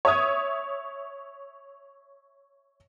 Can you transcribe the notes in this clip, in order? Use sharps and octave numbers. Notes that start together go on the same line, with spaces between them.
C#5 E5 D#6 G#6